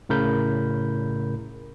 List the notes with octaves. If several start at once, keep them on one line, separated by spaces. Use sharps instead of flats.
A2 C#3 A#4 B5 G6